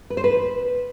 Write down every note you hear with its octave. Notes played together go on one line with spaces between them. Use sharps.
B4
C5
B4